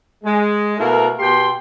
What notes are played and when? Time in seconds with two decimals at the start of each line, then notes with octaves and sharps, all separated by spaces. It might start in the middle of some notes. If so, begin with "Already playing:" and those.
0.24 G#3
0.77 B2 A3 A#3 E4 A4 A#4
1.19 B2 G4 G5 C6